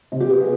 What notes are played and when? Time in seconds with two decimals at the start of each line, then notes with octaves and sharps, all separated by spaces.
0.12 C3
0.20 G4
0.30 B3
0.40 G#4